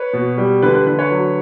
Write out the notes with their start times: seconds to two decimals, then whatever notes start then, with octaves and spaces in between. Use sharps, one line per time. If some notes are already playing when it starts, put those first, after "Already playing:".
Already playing: B4 C#5
0.13 B2
0.38 G3
0.62 D3 B4
0.75 B4
0.87 D3 B4
0.99 B4 C#5
1.11 F#3